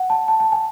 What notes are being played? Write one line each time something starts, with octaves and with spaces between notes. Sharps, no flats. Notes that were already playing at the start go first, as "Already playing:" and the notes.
Already playing: F#5
A5
A5
A5
G#5